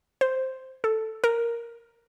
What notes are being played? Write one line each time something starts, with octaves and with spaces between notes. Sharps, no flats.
C5
A4
A#4